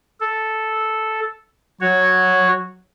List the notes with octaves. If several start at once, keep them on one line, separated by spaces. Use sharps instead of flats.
A4
F#3 F#4 C#5